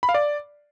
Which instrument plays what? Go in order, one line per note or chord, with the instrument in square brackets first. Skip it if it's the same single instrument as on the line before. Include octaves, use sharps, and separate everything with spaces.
[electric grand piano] B5
F5
D5